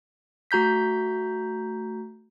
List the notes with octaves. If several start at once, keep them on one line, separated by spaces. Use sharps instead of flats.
A3 F#4 A#5 G6 B6